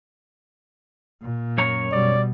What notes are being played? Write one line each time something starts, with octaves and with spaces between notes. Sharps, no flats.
A#2
F#2 C#5 A#5
B2 G3 D5